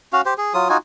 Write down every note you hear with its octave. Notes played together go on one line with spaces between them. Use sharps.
C#4 F#4 F5
G4 C5
G#4
F#3 F4 D#6
D#4 F4 F#4 G#5